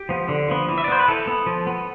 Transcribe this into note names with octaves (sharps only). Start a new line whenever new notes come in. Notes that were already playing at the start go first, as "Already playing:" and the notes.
Already playing: G4
F3 B3
D3
F3 B3
E3
E5
D5
B3 C5
B4
E3 A4
B3
F3
B3